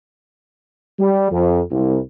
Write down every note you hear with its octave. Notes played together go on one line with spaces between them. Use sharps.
G3
F2
C2